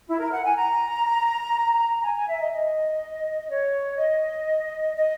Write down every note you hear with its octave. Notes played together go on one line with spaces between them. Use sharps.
E4
A#4
F#5
G#5
A#5
G#5
G#5
E5
D#5
D#5
C#5
D#5
D#5